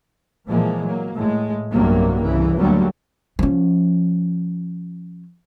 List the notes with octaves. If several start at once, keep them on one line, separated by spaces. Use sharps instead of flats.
A#2 E3 F3 G#3 A#3
F#3 A#3
A2 G#3
B1 G2 C3 F#3 G3 A#3
C2 C#3 E3
D2 D3 F#3 G3 A#3
F3 C#4